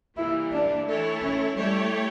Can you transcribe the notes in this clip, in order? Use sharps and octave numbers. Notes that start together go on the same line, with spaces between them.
E3 G3 A#3 E4
D4
E3 A3 E4 A4 C#5
C#4
G3 A3 E4 G4 C#5